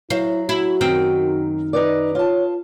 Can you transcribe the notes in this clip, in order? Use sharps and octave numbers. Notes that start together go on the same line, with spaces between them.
F#3 E4 C5 F5
E4 F#4
F#2 D#3 C4
D#4 B4 D5
F4 C#5 A5